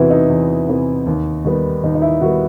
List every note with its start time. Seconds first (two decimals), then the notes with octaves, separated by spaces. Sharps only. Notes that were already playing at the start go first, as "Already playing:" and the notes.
Already playing: E2 C3 E3 B3 E4 F#4
0.10 D#4
0.29 E2
0.68 C3 E3 B3
1.06 D#2
1.45 D#3 G3 B3
1.83 D#2 D#4
1.95 D#4
2.02 E4
2.21 D#3 G3 B3 F#4